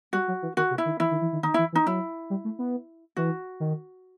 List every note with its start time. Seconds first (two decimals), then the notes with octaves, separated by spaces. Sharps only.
0.13 G3 F#4
0.28 F#3
0.42 E3
0.57 D#3 F#4
0.71 C3
0.78 E4
0.85 D#3
1.00 E3 E4
1.11 D#3
1.21 E3
1.32 D#3
1.43 D#3 D#4
1.54 E3 E4
1.72 E3
1.75 D#4
1.87 F#3 E4
2.30 G3
2.45 A3
2.59 B3
3.17 E3 F#4
3.60 D#3